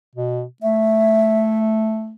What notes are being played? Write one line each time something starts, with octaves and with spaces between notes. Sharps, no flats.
B2
A3 E5